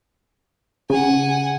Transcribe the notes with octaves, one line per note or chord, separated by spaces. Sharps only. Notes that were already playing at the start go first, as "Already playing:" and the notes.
C#3 F#5 G#5